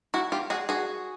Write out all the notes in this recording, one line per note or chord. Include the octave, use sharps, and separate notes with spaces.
E4 F#4
F4 G4
F#4 G#4
F#4 G#4